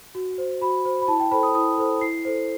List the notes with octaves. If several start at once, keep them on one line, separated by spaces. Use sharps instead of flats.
F#4
C5
F#4 B5
C5
B5
E4 A5
G5
A4 C5 B5
D#6
E4 D#6
A4 C5
E4 C7
A4 C5